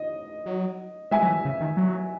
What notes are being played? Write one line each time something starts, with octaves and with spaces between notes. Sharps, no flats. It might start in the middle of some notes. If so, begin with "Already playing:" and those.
Already playing: D#5
F#3
G#3 E5 G#5
F#3
E3
C#3
D#3
F#3